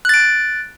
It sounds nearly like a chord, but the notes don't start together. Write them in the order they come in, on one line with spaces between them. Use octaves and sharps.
F#6 A6 D7